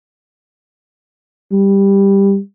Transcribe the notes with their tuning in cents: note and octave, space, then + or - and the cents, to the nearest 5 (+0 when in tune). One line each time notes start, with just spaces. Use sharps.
G3 +10